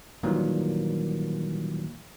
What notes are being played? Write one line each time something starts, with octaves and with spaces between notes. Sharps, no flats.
A#2 D#3 E3 F#3 G3 A#3